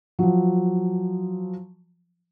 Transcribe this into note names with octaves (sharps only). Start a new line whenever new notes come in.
F3 F#3